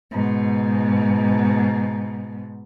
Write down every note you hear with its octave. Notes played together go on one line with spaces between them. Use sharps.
G#2 B2